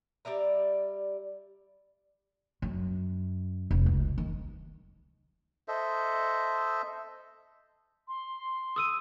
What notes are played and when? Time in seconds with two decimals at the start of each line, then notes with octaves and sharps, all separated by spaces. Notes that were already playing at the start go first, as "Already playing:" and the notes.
0.25 G3 D5 E5 A#5
2.62 F#2
3.71 F1
3.86 C#2
4.18 D#3
5.68 A4 C5 D#5 E5
8.08 C6
8.76 D#6 E6 D#7